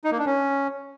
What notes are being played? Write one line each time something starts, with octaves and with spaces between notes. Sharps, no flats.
D#4
A#3
D4
C#4